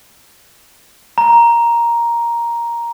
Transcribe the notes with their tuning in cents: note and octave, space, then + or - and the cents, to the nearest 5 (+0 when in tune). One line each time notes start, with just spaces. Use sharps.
A#5 +5